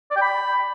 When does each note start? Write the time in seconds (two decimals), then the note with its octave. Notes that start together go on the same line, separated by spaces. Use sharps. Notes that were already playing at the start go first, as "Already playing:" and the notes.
0.11 D5
0.16 G5
0.22 B5